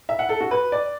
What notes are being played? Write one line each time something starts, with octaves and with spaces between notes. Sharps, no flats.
E5
F#5
A4
F#4
B4
D5